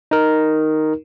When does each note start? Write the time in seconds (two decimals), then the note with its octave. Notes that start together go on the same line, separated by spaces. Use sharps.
0.11 D#4 A#4